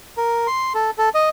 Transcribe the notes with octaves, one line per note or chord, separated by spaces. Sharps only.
A#4
C6
A4
A4
D#5